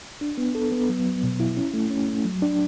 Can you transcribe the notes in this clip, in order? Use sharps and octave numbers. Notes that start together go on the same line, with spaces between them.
D4
B3
A4
B3
F#3
F#3
B2
E4
C#4
A3
C#4
A3
F#3
D4